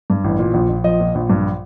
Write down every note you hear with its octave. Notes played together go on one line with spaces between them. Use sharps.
G2
A1
A#2
A#1
A#1
F3 D#5
A#2
A#1
G2